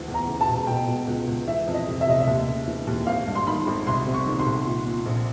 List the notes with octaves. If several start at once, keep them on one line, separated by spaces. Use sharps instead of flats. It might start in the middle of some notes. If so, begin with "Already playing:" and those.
Already playing: D2 E3
E2
A#5
C#3
A5
E1
B2 G5
B2
C#2
C#2
E3 E5
F2
D#5
C3
E5
F1 D#5
E5
D#2
C#3
E3
D#2
G#1 F5
G2
C6
D#3 B5
G#1
C2 C6
C3
C#6
D#3
C6
C2
A#2
A#2
A#1